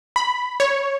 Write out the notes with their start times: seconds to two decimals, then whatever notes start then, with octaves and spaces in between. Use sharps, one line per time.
0.16 B5
0.60 C#5